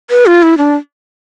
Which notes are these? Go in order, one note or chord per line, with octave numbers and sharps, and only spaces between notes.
B4
F4
E4
D4